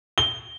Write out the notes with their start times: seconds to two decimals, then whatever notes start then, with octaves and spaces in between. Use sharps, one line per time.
0.18 G7